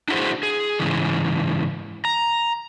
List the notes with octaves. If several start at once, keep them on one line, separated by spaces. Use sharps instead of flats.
D4 E4 F#4 G#4 C5
G#4
G#2 C#3 E3
A#5